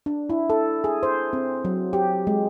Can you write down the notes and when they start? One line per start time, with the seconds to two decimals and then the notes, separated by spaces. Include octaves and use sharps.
0.06 D4
0.30 E4
0.50 A4
0.84 G#4
1.03 C5
1.33 C4
1.65 F#3
1.93 G4
2.27 G#3